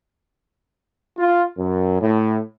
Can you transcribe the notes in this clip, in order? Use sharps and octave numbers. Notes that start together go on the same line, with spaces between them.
F4
F#2
A2